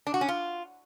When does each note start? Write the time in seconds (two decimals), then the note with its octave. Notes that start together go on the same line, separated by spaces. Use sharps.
0.07 D4
0.14 F#4
0.21 C#4
0.28 F4